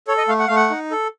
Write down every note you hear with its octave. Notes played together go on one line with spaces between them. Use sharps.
A4 C#5
D#5
A3 F5
F#5
A3 F5
F#5
D#4
A4